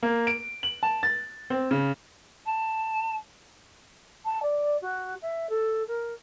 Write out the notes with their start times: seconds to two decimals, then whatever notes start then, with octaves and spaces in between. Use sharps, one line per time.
0.03 A#3
0.27 D7
0.63 F#7
0.83 A5
1.03 A6
1.50 C4
1.71 C#3
2.45 A5
4.24 A5
4.42 D5
4.82 F#4
5.22 E5
5.49 A4
5.88 A#4